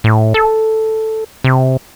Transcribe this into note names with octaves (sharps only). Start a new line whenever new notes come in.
A2
A4
C3